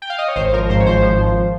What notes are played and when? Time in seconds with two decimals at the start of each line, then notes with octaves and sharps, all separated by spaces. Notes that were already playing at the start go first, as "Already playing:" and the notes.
0.02 G5
0.10 F5
0.18 D#5
0.28 C#5
0.36 G#1 C5
0.53 F3 A#4
0.69 G#2 C5
0.80 C#5
0.86 G#1 C5
1.02 F3
1.19 G#1